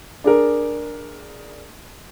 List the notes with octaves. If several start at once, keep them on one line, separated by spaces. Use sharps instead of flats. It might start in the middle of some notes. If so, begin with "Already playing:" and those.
D4 G#4 A#4